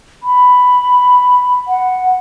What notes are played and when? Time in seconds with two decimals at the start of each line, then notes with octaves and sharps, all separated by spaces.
0.23 B5
1.68 F#5